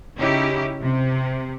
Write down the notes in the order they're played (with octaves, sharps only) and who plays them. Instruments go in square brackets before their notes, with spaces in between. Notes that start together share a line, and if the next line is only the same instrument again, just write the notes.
[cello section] C#3 C#4 D#4 E4 G4
C3